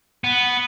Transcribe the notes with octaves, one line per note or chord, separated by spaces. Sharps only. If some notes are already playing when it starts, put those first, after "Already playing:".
B3